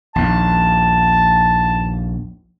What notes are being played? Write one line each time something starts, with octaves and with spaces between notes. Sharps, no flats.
A#1 D#2 A5